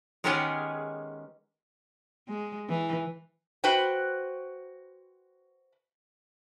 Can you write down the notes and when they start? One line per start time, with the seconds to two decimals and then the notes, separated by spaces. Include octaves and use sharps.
0.24 D#3 G#3 B3 C#4 G4 G#4
2.28 G#3
2.69 E3
3.64 F#4 B4 C5 G5